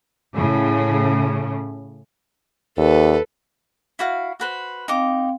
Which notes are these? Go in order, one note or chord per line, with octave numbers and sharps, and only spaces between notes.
A2 C#3
D#2 A4 B4
E4 F#4 F5
F#4 B4 C5
C4 D#4 F5 G5 D6